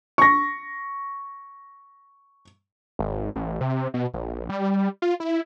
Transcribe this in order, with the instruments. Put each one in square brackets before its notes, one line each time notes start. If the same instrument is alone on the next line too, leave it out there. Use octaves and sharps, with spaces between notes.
[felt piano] C#6 A#6
[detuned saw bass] G#1
A1
C3
B2
A#1
G3
F4
E4